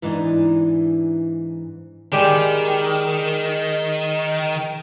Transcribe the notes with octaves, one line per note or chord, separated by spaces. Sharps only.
G#2 E3 D4 D#4
D#3 G3 G#3 G4